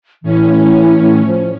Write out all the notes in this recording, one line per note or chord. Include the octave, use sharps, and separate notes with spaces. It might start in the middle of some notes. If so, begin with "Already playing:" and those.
A2 E3 C#4
F3